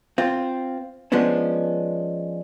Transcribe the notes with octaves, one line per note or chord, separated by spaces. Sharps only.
C4 F4
F3 G#3 B3 C#4 D4